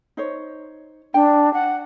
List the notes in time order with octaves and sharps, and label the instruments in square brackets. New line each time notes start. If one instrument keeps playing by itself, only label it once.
[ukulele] D#4 C5 C#5
[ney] D4 [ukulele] G5
[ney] F#5